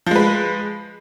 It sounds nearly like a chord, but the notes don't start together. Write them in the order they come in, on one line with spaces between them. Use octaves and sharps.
F3 G#3 B4